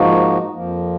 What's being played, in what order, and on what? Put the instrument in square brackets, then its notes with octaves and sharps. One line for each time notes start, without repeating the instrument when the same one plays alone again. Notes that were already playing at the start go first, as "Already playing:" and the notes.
Already playing: [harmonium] G#2 F3 A#3 D#4 F#4
F2 F3 A#3